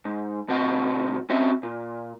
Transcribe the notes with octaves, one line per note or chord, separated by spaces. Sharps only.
G#2
D2 B2 C4 F#4 D#5 F#5
C4 C#4 F#4 D#5 E5
A#2